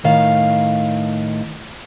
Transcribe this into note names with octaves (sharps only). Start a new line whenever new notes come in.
A2 D#3 F5